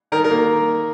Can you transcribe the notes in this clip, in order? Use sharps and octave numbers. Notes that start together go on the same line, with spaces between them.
D#3 A#4
A#4
A#3